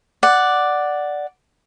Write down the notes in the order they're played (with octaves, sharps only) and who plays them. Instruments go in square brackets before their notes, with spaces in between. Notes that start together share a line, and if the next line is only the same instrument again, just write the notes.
[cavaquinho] D5 F#5